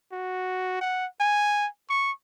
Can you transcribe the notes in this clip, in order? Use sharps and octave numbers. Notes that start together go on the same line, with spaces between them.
F#4
F#5
G#5
C#6